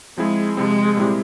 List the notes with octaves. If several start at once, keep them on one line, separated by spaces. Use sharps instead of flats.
F3 G#3 C4 E4 G#4
C3 F3 G#3 C4
A#2 G3 C4 E4 G4